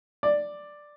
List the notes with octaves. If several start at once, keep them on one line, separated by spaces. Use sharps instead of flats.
D5